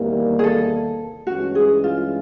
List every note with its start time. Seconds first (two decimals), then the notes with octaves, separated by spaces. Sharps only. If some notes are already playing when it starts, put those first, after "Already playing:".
Already playing: E2 C3 D#3 G3 A#3
0.39 G#4
0.44 A4
1.27 G2 E3 G#3 C#4 F#4
1.55 G#4
1.84 F4